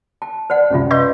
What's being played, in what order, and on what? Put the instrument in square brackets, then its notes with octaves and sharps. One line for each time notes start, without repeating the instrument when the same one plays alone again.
[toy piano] A5
C5 D5 F#5
[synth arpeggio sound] C#2 F#2 C3 [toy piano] C#4 F4
[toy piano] B4 F5 [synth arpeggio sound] D#5 C6 G6